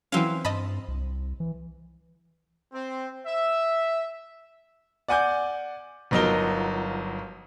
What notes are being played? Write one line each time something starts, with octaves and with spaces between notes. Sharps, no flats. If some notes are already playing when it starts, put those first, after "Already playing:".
E3 F#3 C4 C#4 F5
G2 D#5 A5 B5
C2
E3
C4
E5
D5 F#5 G#5 D6 G6
G1 F3 F#3 D#4 A#4 G7